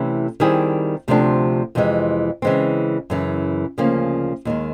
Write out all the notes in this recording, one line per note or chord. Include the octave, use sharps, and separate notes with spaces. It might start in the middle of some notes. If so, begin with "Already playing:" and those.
Already playing: C3 E3 A3 C#4 E4
D#3 G3 C4 E4 G#4
D2 C3 F3 A3 D4
F2 C3 E3 G#3
C#3 E3 G#3 C4
F#2 C#3 E3
D2 C#3 F3 A#3 C#4
D#2 D#3 G#3